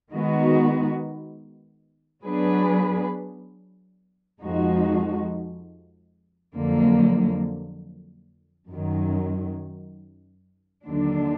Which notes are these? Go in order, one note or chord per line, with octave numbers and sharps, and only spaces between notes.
D#3 G#3 B3 D#4 F#4
F#3 B3 D4 G#4 B4
F2 F3 G#3 D#4 F#4
F2 D3 F#3 A#3
F#2 D#3 F#3
D#2 D3 F#3 D4